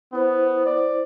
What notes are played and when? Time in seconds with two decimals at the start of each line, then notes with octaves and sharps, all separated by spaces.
0.13 B3 E4 C5
0.66 D5